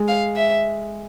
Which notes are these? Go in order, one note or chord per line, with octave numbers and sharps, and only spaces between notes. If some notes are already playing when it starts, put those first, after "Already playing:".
Already playing: G#3
F5
E5